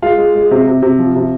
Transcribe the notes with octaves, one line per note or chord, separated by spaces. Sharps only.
G#3 F4 F5
G#3
G#3
C3
C3
C3
F3
C3